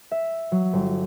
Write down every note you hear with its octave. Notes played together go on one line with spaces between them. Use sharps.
E5
F#3
G1